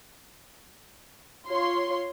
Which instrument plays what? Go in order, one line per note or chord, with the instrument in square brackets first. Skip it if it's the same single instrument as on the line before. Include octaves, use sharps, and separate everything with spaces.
[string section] F4 C#5 C6